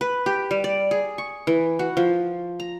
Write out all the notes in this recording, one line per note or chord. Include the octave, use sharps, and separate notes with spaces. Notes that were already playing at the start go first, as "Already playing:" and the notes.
B4
G4
G3
D5
G#4
C#6
E3
F#4
F3
A#5